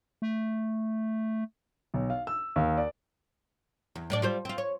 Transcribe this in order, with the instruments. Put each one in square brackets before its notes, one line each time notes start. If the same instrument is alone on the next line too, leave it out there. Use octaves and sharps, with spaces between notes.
[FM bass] A3
[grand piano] B1
F5
E6
D#2
D5
[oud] E2
A2 D4 D5
G3 F4 C5
C4 F4
C#5